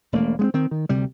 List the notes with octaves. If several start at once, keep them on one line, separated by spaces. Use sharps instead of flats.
E1 A3 A#3
G#3 B3 C4
D#3 C4
D#3
D2 C3 G3